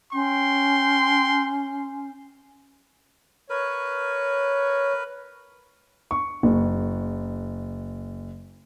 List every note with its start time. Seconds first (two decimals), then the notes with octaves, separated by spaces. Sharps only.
0.14 C#4 G5 C6
3.50 A#4 B4 C#5
6.11 C#6
6.43 F#1